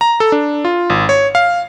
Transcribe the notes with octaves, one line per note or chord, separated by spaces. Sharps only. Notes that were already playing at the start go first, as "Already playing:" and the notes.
A#5
A4
D4
F4
G#1
C#5
F5